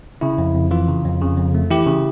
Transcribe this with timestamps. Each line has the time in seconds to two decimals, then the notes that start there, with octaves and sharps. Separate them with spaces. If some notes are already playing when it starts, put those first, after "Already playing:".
0.21 C#3 E4
0.38 F2
0.55 F2
0.71 E3 F4
0.88 C#3
1.05 F2
1.21 C#3
1.37 F2
1.55 A3
1.70 E3 E4 G4
1.87 C#3